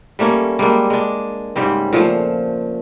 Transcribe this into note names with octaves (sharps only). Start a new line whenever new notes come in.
G3 A3 A#3 C#4
G3 G#3 A#3 D4
G#3 D4
G#2 C#3 G3 C4
A#2 F3 A3 F5